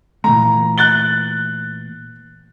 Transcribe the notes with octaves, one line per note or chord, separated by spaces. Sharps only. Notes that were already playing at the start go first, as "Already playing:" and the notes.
A#2 E3 A3 A#5
F#6 A6 G7